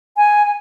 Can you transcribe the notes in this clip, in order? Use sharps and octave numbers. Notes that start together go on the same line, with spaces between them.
G#5
G#5